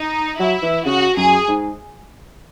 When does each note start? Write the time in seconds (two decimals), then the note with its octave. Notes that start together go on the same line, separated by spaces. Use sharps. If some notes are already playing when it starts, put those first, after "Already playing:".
Already playing: D#4
0.39 F#3 E4
0.62 E3
0.85 C#3 F#4
1.17 F#2 G#4
1.48 G#2